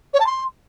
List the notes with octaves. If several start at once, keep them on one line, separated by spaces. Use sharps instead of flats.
C#5
A5
C6